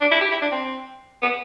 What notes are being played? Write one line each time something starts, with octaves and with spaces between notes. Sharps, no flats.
D4
E4
G4
E4
D4
C4
B3